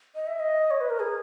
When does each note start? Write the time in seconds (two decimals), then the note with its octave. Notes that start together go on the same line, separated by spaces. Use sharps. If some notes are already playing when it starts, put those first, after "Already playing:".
0.15 D#5
0.27 E5
0.40 D#5
0.71 C#5
0.81 B4
0.90 A#4
1.00 G#4